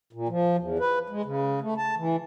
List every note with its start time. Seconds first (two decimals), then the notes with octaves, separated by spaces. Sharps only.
0.13 A#2
0.29 F3
0.57 E2
0.79 B4
1.10 G#3
1.25 C#3
1.61 A3
1.77 A5
1.97 E3